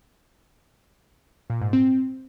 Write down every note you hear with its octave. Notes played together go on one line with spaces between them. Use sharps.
A#2
G#2
C4